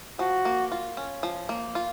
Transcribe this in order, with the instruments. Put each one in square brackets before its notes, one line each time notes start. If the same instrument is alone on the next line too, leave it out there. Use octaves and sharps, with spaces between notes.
[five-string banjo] F3 [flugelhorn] F#4
[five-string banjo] A#3
F4
C#4
F3
A#3
F4